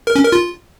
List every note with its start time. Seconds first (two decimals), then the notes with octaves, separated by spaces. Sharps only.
0.07 A#4
0.16 C#4
0.24 A#4
0.32 F4